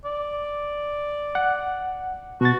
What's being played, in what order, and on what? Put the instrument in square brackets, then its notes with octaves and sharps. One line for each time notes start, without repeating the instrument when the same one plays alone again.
[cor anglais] D5
[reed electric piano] F#5
[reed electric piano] B2 A6 [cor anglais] F#4